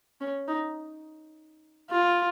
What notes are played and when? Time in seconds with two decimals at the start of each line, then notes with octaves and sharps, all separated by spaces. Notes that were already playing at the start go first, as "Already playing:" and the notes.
0.21 C#4
0.48 D#4
1.91 F4